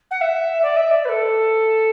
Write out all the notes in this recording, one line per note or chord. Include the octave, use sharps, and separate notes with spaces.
F#5
E5
D5
E5
D5
B4
A4